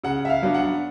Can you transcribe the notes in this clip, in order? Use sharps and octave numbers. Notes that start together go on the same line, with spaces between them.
C#3 F#5
E5
F5
F#3 B3 D4
F#5